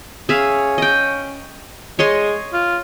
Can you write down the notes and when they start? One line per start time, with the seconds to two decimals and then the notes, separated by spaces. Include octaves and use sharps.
0.29 C#4 G#4 E5 F5
0.78 D#5 G5
1.99 G#3 C#5 D#5 C6
2.53 F4